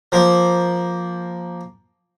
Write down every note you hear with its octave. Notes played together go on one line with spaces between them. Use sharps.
F3 A#3 C5